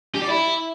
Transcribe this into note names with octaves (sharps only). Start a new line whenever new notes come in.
G4
D5
E4